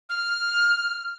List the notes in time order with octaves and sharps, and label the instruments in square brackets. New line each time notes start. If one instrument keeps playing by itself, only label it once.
[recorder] F6